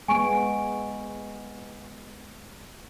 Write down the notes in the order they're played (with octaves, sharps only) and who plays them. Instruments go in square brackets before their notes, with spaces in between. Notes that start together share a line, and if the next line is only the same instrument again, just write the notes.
[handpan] G#3 B3 [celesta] G#5 C#6 D7